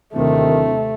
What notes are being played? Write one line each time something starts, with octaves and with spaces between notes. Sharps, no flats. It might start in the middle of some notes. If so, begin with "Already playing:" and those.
D1 D#2 C3 D#3 A3